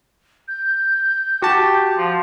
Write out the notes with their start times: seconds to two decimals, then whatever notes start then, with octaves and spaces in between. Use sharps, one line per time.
0.48 G6
1.42 F#4 G4 A5
1.97 F3